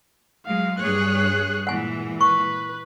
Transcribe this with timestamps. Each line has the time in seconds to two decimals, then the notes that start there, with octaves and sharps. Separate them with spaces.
0.46 F#3 G#3 F5
0.79 G2 G#4 C#5 F#6
1.67 A#2 E3 G#3 F#5 G#5
2.21 B4 C#6